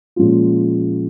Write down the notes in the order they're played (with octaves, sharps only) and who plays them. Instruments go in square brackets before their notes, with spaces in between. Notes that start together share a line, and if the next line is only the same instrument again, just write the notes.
[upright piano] A#2 F3 G#3 C#4 F4